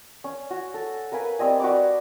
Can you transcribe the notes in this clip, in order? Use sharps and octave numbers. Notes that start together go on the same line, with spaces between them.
C#4
F#4
A4
A#4 B4 F5 G#5
G3 C4 D#5 G#5
F#4 B4 D6